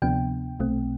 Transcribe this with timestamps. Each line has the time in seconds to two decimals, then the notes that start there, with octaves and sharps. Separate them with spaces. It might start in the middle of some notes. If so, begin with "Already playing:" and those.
0.02 D2 C3 F3 B3 D4 G5
0.60 B1 B2 A3 C4